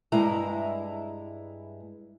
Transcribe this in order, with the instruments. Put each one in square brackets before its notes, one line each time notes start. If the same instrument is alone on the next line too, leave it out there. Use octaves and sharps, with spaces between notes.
[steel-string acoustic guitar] G2 G#3 E4 A#5